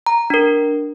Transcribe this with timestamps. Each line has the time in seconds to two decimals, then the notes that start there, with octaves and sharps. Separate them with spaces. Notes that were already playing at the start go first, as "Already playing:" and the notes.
0.06 A#5
0.30 D4 A#4